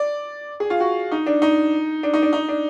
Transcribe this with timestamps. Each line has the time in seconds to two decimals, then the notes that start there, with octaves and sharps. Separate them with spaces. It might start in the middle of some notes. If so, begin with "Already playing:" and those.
Already playing: D5
0.60 G#4
0.70 F4
0.80 F#4
1.12 D#4
1.26 D4
1.42 D#4
2.03 D4
2.13 D#4
2.22 D4
2.33 D#4
2.48 D4